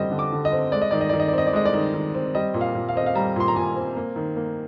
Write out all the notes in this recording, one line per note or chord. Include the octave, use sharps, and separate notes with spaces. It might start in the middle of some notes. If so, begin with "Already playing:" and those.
Already playing: D3 G3 C4 D#5
D3
D6
D3
D#5
C4
G#3 D5
D#5
D#3 D5
D#5
D#3 D5
D#5
D5
C4 D#5
D5
G#3 D#5
D5
D#3
D#3
C4
G3 D#5
A#2
F5
A#2
F5
C4 D#5
F5
G3 A#5
A#2 C6
A#5
A#2 G#5
C4
A#3
D#3
A#3